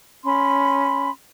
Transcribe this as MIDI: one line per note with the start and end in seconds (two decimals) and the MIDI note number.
0.25 1.10 61
0.25 1.10 83
0.25 1.10 84